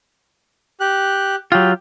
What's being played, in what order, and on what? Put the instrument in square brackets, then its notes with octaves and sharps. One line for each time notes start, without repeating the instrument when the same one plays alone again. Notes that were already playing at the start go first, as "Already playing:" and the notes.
[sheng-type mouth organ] G4 F#6
[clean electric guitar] F#3 F4 [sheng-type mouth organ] G4